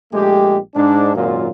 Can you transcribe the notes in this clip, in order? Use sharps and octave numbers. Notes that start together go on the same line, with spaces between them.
A#1 G#3 A3 G4
G#2 D4
G#1 F#2 A#2 F#3 F4